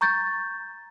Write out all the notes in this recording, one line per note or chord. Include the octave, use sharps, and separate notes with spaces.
A#5 C#6 G6 A6